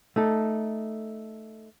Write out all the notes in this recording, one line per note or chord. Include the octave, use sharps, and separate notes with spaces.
A3 D#4 A4